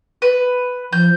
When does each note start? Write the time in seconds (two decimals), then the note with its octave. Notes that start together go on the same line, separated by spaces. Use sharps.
0.22 B4
0.93 F3 G6